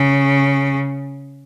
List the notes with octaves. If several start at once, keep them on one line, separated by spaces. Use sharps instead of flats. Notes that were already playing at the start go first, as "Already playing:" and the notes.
Already playing: C#3